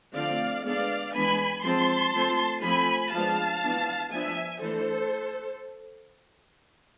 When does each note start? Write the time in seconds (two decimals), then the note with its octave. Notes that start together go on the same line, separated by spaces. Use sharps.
0.15 D3 F3 A3 C4 D5 F5
0.65 G#3 B3 D4 D5 F5
1.14 E3 G#3 B3 D4 G#5 B5
1.64 F3 G#3 C4 A5 C6
2.14 F3 A3 C4
2.63 F3 A3 C4 G#5 B5
3.13 F3 G#3 B3 D4 F5 A5
3.63 E3 B3 D4
4.12 F3 B3 D4 E5 G#5
4.61 E3 A3 D4 A4 C5